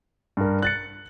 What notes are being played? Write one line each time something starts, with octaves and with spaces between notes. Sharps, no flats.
G2 A#4
F#6 A6 C#7